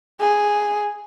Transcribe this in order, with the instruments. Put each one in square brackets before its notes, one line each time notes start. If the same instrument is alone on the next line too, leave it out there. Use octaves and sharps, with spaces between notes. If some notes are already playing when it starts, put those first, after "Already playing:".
[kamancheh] G#4